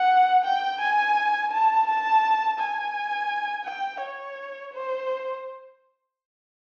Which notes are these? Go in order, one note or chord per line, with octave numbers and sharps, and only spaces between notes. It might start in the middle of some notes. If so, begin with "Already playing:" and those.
Already playing: F#5
G5
G#5
A5
A5
G#5
G5
C#5
C5